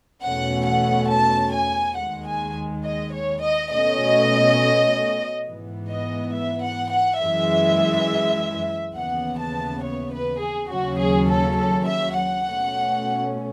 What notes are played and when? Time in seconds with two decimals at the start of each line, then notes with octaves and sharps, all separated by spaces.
0.23 E2 B2 A3 C#4 F#5
0.66 F#5
1.10 A5
1.53 G#5
1.97 D#2 D#3 G#3 F#5
2.27 G#5
2.85 D#5
3.14 C#5
3.42 D#5
3.72 B2 A3 C#4 D#5
5.46 G#2 E3 B3
5.90 D#5
6.34 E5
6.63 F#5
6.91 F#5
7.20 F#2 E3 G#3 E5
8.95 D#2 C#3 E3 B3 F#5
9.38 A5
9.82 C#5
10.12 B4
10.40 G#4
10.69 D#2 C#3 F#3 C#4 F#4
10.98 G#4
11.28 A4
11.56 A4
11.86 E5
12.15 F#5
12.44 B2 A3 C#4